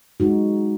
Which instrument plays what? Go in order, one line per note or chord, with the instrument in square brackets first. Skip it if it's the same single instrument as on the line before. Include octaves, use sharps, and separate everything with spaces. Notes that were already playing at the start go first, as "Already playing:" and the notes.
[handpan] G#3 D#4 F#4